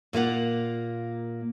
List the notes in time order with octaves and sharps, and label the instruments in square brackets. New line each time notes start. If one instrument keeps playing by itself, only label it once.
[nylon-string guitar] A#2 A#3 F4 F#5